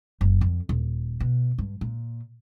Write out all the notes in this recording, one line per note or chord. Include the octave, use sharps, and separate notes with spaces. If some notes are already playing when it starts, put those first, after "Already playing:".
F#1
F2
D#1
B2
G2
A#2